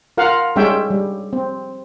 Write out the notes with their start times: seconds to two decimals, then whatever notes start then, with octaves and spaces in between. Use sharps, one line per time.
0.17 F4 A#4 F5 F#5
0.56 G3 G#3 C#4 C#5 E5 G5
0.90 G3
1.33 C4